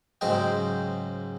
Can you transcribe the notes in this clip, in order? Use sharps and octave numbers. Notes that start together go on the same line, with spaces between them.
G#2 C#3 F#3 C5 D#5 G5